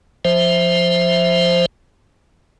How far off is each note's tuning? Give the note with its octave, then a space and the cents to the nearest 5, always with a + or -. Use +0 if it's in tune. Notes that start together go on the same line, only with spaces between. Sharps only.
F3 +15 C5 +0 E5 +0